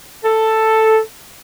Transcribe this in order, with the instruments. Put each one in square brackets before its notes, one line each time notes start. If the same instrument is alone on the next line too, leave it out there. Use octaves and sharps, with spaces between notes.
[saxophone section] A4